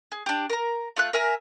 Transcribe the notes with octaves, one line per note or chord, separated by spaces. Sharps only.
G#4
D4 G4
A#4 A#5
A3 F4 E5 F#6
A#4 E5 G#5 A#5